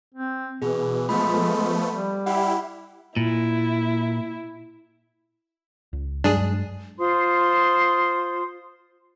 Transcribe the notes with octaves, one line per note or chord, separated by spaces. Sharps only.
C4
B2 E3 G#4
F3 G#3 A3 B3 B5
G3
E4 G4 F#5 B5
A#2 E4
C#2
G2 F#3 G#3 D4 G#4
F4 C5 C6 D#6